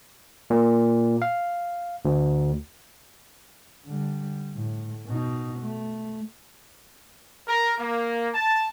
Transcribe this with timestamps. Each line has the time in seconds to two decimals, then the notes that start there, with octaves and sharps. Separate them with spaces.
0.50 A#2
1.22 F5
2.05 D2
3.86 D3 G3
4.54 A2
5.06 B2 D#4
5.60 A3
7.48 A#4
7.78 A#3
8.34 A5